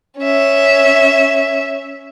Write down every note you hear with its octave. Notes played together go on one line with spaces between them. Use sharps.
C#4 E5